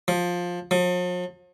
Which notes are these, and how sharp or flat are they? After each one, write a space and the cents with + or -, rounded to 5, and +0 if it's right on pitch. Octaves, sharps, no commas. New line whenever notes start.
F3 +15
F3 +45